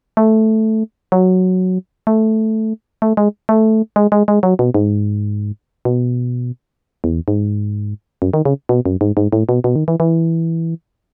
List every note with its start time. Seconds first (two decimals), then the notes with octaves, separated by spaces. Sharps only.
0.17 A3
1.12 F#3
2.07 A3
3.02 A3
3.17 G#3
3.49 A3
3.96 G#3
4.12 G#3
4.28 G#3
4.43 F#3
4.59 B2
4.74 G#2
5.85 B2
7.04 E2
7.28 G#2
8.22 F#2
8.34 D#3
8.45 C#3
8.69 B2
8.86 F#2
9.01 G#2
9.17 G#2
9.33 A2
9.49 B2
9.64 B2
9.76 D#3
9.88 E3
10.00 E3